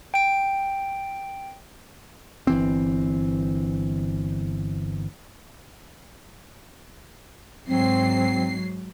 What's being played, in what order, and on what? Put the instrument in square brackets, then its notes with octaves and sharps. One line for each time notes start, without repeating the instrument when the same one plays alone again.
[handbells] G5 D7
[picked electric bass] G1 E3 C4
[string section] G#2 F#3 C7 [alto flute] C4